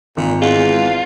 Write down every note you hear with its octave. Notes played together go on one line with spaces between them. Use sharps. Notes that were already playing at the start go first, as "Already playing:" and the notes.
G#1 A#2
E2 G#3 F4